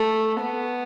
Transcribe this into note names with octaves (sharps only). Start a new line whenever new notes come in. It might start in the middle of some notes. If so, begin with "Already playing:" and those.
Already playing: A3
B3